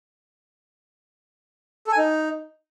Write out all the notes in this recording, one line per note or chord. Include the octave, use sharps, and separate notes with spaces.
A4
G#5
D#4